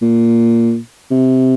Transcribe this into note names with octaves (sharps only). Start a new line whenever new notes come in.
A#2
C3